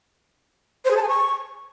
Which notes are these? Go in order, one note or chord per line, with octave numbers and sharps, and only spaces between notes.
C5
G#4
A5
G#5
C#6